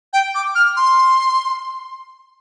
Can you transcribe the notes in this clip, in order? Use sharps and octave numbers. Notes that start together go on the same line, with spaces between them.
G5
D6
F6
C6